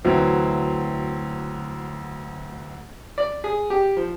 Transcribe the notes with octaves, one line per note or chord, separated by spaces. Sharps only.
D2 E3 F#3 C4
D5
G#4
G4
F3